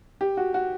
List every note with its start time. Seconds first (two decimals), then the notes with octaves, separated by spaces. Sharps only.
0.21 G4
0.37 F#4
0.54 F#4